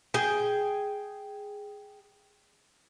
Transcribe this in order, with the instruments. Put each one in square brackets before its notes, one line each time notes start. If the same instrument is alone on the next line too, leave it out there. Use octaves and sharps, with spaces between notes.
[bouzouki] G#4 G5